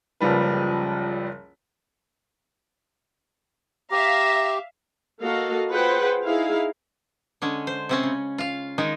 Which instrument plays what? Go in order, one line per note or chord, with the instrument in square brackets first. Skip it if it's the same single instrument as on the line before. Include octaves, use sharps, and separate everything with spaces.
[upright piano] F#1 C#2 F3 G3 B4
[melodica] G4 [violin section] E5 F5 [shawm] A#5
[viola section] A#3 F#4 A4 D#5 F5
F4 G#4 B4 C5 F#5 G5
D#4 E4 G#4 F5
[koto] D3 G#3 C#4
C5
C3 C4 C#4
C#3
F4 F5
D#3 G#3 D#4